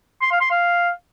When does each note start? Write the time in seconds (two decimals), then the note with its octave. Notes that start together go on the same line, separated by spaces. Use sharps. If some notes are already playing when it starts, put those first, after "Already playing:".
0.22 C6
0.31 F5
0.41 C6
0.50 F5